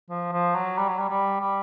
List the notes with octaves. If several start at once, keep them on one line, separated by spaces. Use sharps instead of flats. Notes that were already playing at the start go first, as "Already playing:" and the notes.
F3
F3
F#3
G3
F#3
G3
G3
G3